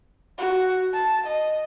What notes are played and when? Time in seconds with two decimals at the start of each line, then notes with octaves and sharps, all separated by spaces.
0.38 F#4
0.93 A5
1.27 D#5